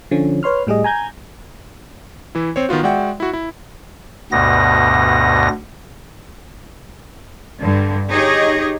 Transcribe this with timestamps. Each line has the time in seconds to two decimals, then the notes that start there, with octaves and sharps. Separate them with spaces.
0.11 D3 F3 C#4
0.43 B4 C#5 C6 F6
0.67 A2 G3 G#4 D#5
0.84 G#5 A#5 G6 G#6
2.35 E3 E4
2.56 C4 C5 C#5
2.69 D#3 B3 F4 F#4
2.83 G#3 F#4 D5 E5 F#5 G5
3.20 E4 F#4
3.33 E4
4.32 D2 G2 B2 B3 A#6
7.60 G2 D3
8.11 D#4 G4 G#4 C#5 D#5